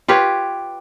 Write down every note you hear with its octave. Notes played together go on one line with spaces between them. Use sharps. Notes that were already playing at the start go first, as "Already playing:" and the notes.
F4 G4 B4 C#5